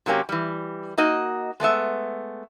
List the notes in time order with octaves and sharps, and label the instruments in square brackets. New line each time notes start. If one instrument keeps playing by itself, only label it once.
[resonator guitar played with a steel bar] C3 F#3 A#3 C#4 G4
E3 G3
A#3 D#4 F#4 D#5
G#3 A3 B3 E5